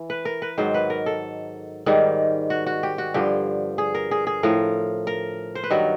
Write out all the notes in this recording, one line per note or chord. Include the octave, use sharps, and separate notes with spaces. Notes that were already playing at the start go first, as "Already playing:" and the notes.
Already playing: E3
B4
A#4
B4
G#2 D#3 F#3 C5
B4
A#4
A4
G#2 D#3 G3
F#4
F#4
G4
F#4
G2 D3 F3 G4
G#4
A#4
G#4
G#4
A2 F3 A#4
A#4
C5
B4
G2 D#3 F#3 A#4